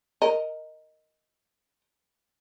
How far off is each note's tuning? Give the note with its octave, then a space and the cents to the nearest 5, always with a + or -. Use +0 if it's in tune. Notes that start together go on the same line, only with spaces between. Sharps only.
A#4 +0 D#5 +0